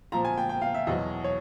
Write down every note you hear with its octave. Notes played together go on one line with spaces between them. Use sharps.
A#2 F3 A#5
G#5
G5
G5
F5
E5
E2 B2 F#3 D#5
C#5